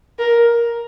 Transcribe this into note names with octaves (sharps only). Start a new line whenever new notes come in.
A#4